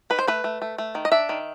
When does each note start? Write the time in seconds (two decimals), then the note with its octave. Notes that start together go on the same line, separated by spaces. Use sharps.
0.10 D#3 B4
0.19 C5
0.28 A3 B4
0.44 A3
0.62 A3
0.78 A3
0.95 D#3
1.05 D#5
1.12 D4 E5
1.29 D#3